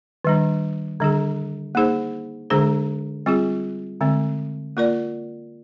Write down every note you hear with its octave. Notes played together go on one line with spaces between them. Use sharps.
D#3 G3 D4
D3 G3 D4 G#4
A#3 D#4 G#4 C5
D3 G#3 D4 G#4 C5
G3 C4 F4 G#4
D3 G#3 C4
A#3 F4 A#4 D5